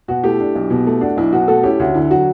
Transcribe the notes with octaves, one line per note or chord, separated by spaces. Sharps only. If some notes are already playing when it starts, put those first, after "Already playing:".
B2 F#4
A3 E4 G4
D4
B1
B2
A3
D4 F#4
B1 E4
B2 F#4
A3 F#4 A4
C#4 E4 G4
D2 F#4
D3 E4
F#3 F#4